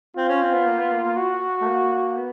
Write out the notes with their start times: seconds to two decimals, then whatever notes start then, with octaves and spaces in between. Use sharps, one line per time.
0.16 C4 F4
0.28 C#4
0.42 C4
0.54 B3
0.66 A#3
0.79 B3
0.91 A#3
1.04 A#3
1.17 F#4
1.61 A3
1.66 A#3
2.17 B3